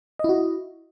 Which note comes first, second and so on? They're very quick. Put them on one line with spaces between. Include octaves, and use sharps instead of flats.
D#5 E4 F#4